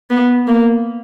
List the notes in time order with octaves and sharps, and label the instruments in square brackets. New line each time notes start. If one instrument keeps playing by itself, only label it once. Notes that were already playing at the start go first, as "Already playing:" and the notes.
[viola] B3
A#3